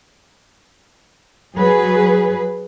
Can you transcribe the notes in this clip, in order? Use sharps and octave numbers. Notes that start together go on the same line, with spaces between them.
F#3 G#4 B4